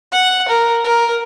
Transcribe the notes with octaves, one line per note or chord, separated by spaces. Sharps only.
F#5
A#4
A#4